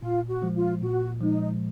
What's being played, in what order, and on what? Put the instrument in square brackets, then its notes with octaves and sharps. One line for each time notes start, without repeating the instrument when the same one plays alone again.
[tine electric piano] A#2 [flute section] F4
[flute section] F#4
[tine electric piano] F3 G#3
[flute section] F4
[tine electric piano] A#2 [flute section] F#4
[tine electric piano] F3 G#3 [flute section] D#4